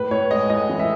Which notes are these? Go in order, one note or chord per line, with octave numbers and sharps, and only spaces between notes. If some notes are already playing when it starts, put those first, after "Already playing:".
Already playing: A2 B4
A2 C#5
G#3 D#5
A2 D#5
E3
E5